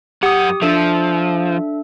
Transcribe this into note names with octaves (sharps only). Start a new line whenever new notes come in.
F#2 G4 F#5 D#6
F3 D4 A4 E5